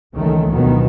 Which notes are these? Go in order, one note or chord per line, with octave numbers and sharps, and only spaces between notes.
C#2 D#3 E3 G#3 A3
D2 B2 D#3 F3 F#3 B3